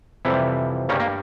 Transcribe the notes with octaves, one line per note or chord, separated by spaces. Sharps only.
F2 C3 E3 G3 E4
G2 C#3 G3 A#3 C#4
A#3